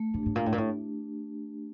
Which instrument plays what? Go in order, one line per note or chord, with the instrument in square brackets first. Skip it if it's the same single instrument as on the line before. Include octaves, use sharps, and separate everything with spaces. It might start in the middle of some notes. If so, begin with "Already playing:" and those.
Already playing: [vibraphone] A3
[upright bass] A2 [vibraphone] D4
[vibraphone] G4
[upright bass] A2
[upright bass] A#2 [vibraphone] A3
[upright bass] A2
A#2
[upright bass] A2 [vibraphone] D4 G4